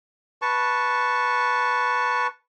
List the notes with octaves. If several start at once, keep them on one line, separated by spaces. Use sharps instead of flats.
B4 A5 C#6